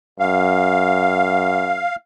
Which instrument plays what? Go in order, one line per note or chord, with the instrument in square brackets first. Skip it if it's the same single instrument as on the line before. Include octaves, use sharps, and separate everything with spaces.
[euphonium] F#2 [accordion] F5